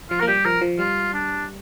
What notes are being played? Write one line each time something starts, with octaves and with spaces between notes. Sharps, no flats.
F3 F4
A#3 A#4
G3 G4
F3 A#4
F3
G3 F4
D4